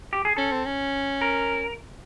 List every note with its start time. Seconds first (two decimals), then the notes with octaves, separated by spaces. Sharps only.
0.13 G4
0.25 G#4
0.37 C#4 A4
0.52 C4
0.66 C#4
1.21 A#4